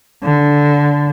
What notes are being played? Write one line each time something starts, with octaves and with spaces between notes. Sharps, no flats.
D3